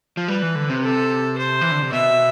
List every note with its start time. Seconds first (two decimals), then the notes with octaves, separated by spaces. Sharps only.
0.17 F3
0.28 G3 B4
0.42 E3
0.55 D3
0.70 C3
0.83 A4
1.38 C5
1.61 E3
1.71 D3
1.82 C3
1.92 B2 E5